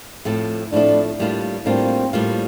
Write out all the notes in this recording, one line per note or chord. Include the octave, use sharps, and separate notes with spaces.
A2 F3 C4 E4 A4
A2 F3 C4 D4 E4 A4
A2 G3 A#3 D4 F4
A2 G3 A#3 C4 D4 F4
A2 G3 A#3 D4 F4